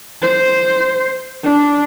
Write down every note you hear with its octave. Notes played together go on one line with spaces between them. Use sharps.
C5
D4